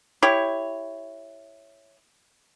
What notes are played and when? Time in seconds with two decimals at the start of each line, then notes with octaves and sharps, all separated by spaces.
0.22 E4 G4 C#5